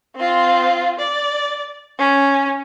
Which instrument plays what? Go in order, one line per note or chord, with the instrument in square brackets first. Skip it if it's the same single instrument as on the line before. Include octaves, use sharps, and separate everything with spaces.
[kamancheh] C4 F4
D5
C#4